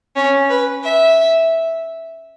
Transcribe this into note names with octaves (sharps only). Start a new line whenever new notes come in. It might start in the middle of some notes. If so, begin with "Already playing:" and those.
C#4
B4
E5